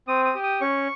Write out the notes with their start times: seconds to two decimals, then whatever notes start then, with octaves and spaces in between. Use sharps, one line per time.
0.08 C4 D#6
0.25 D#6
0.35 G4
0.43 D#6
0.61 C#4 C#6